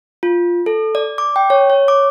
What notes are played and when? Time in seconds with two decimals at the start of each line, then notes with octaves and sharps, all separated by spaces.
0.23 F4
0.66 A4
0.95 D5
1.18 D6
1.36 G5
1.50 C#5
1.70 C#5
1.88 D6